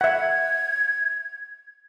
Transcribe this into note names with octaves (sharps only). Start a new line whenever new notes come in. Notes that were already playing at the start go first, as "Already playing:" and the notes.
E5 F#5 G#6